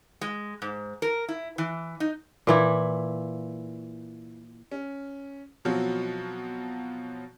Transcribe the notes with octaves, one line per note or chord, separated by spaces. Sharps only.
G#3
G#2
A#4
E4
E3
D#4
A#2 E3 E4
C#4
B2 F3 F#3 C4 F#4